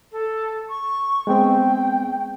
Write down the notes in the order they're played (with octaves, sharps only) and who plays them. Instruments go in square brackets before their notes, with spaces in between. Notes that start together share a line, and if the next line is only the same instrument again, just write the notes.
[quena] A4
C#6
[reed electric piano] G#3 B3 C4 [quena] G5